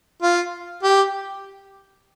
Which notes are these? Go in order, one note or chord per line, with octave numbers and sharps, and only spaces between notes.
F4
G4